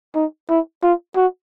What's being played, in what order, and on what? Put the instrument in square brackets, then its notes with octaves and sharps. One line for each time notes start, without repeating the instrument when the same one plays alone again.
[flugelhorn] D#4
E4
F4
F#4